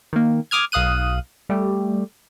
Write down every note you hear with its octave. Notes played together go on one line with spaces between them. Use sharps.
D#3 A#3
D6 D#6 F6 G#6
B1 F5 D#6 F#6 D#7
G3 A3 G4